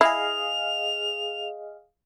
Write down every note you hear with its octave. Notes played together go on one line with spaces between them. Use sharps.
E4 G#4 D#5 F5 F7